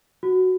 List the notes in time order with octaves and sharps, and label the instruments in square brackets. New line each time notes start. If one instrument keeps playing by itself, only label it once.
[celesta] F#4